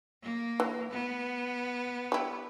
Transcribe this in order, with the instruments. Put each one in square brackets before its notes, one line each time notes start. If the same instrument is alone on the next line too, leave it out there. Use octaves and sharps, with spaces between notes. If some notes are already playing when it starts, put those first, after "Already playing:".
[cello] A#3
[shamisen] E3
[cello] B3
[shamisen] G3 E4